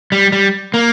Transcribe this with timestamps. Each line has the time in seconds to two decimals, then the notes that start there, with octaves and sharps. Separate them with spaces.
0.12 G3
0.32 G3
0.74 A#3